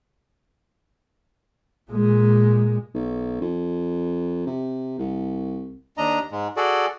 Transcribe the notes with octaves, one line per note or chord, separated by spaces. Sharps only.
A#2 G#3
B1
F2
C3
C2
D#2 D4 D#5 A#5
G#2 G#3
F#4 G#4 A4 D5